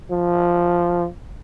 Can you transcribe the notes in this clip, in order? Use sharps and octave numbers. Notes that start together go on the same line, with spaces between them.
F3